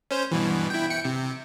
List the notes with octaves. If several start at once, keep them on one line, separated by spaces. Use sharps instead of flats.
C#4 C5
G2 B2 E3
E4 G5
G5 C#7
C3